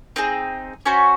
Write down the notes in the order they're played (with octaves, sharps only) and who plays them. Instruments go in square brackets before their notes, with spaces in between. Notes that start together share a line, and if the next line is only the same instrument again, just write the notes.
[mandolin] C4 D#4 G#4
C#4 F#4 C5